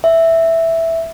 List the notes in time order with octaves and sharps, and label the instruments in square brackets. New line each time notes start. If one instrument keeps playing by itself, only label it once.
[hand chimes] E5